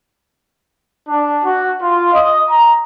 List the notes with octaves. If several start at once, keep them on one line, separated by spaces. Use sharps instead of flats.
D4
F#4
F4
D#5
A#5